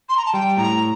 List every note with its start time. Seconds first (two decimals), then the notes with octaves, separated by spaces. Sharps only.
0.09 C6
0.17 A#5
0.26 A5
0.34 G3 G5
0.57 A2 A#5